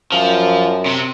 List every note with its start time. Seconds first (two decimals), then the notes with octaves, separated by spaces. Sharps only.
0.12 F#2 F3
0.86 C3